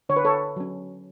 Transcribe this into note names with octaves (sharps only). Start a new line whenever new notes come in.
D3 C#5
B4
A4 C#5
F#3 C#4